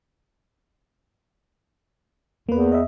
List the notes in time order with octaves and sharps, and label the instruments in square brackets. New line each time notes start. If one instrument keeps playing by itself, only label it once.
[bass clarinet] E2 [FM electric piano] A#3 B4
[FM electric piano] D#5 E5